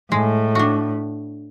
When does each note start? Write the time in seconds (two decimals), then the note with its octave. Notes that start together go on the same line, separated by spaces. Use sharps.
0.12 A2 G#3
0.55 D4 F#4